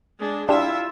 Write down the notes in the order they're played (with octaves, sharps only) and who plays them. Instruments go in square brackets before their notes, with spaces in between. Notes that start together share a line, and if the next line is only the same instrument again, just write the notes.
[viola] G#3 D4
[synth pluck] D4 G4 E7 [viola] E4 E5 [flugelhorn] F4